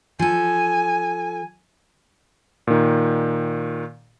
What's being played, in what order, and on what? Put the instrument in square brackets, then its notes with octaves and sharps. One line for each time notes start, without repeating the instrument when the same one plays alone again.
[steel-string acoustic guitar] F3 A4 [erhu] G#5
[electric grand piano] A#2 D#3